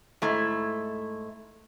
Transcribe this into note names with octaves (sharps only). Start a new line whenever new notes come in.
G#2 A3 E4